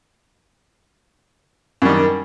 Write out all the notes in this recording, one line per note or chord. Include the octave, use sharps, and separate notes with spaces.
F#2 D#3 G3